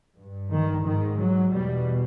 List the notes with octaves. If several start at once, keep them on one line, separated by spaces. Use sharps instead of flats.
G2
D#3
G#2 D#3
F#3
E2 B2 G3